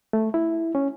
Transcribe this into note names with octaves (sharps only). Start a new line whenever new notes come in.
A3
E4
C#4